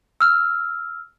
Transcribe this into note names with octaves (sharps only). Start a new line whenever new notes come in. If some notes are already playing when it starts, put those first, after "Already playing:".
E6 F6